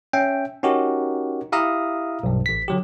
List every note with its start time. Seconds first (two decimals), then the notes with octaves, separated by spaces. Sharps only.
0.13 C#4 E5 G5
0.63 C#4 D#4 F#4 G4 A#4
1.52 E4 G4 E5 F5 A#5 D#6
2.23 B1 G2
2.46 A1 B6
2.68 D3 F#3 G4